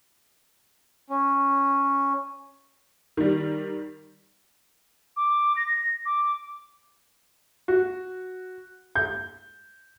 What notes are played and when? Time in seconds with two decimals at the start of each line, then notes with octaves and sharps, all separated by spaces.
1.10 C#4
3.17 D#3 G3
5.17 D6
5.57 A#6
6.06 D6
7.68 F#4
8.95 G6